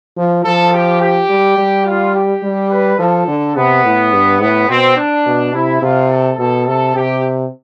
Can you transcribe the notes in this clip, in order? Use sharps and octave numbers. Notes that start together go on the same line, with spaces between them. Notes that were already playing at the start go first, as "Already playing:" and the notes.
F3
F3 A4
G4
G4
G3
G3
F4
G4
G3
B4
F3 A4
D3
C3 B3
A2
G2
A2 B3
B2 C4
D4
B2
C3 E4
C3 F4
A4
B2 A4
C3 A4
C3 G4